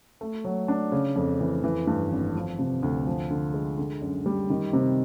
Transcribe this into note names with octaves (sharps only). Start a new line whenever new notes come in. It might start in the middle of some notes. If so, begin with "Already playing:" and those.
A3
F#3
D4
C#3
F2
E3
E3
G2
G#1
F3
C3
D2
F3
D3
G#3
D3
F#2
G3
D#3
C3